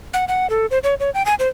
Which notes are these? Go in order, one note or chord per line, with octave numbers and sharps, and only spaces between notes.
F#5
F#5
A4
C5
C#5
C#5
G5
G#5
C5